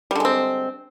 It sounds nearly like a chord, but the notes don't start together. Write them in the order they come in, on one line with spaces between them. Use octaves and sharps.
G3 D3 G#3 C4